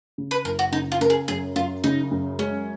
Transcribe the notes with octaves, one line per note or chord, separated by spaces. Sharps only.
C#3
B4
F#1 A#4
F#4
C#3 D#4
F4
C#3 A#4
G#4
F#2 G#4
F#2 F4
C#3 D#4
F#2
G#3 C#4